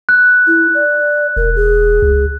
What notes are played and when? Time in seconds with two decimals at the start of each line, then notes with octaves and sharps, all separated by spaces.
0.09 F#6
0.47 E4
0.75 D5
1.37 E1 A#4
1.56 G#4
2.02 C#2